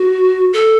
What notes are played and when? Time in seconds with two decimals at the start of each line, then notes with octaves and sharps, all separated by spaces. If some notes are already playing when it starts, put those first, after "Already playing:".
Already playing: F#4
0.53 A4